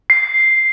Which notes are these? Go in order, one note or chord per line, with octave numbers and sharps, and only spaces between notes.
C7